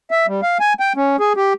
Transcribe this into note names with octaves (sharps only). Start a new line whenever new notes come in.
E5
G3
F5
G#5
G5
C#4
G#4
G4